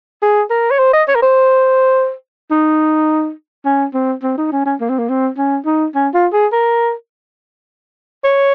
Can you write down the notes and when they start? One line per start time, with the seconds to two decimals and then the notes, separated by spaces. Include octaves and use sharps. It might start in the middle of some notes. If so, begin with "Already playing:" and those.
0.22 G#4
0.50 A#4
0.71 C#5
0.79 C5
0.93 D#5
1.08 C#5
1.15 A#4
1.22 C5
2.51 D#4
3.65 C#4
3.94 C4
4.23 C4
4.37 D#4
4.52 C#4
4.65 C#4
4.81 A#3
4.89 C4
4.98 A#3
5.09 C4
5.37 C#4
5.66 D#4
5.95 C#4
6.14 F4
6.33 G#4
6.52 A#4
8.24 C#5